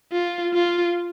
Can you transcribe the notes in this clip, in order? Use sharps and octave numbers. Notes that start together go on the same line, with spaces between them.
F4
F4